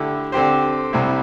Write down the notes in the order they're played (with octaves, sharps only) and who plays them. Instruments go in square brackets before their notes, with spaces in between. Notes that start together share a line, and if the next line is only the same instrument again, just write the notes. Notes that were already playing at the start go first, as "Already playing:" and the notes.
Already playing: [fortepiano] D3 A3 E4 G4
D3 C4 G4 C5
C2 C3 G3 E4 C5